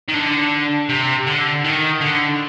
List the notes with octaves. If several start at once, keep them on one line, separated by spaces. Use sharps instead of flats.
D#3
D3
C3
D3
D#3
D3